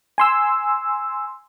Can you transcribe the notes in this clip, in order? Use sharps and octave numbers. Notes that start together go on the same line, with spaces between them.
G#5 C6 E6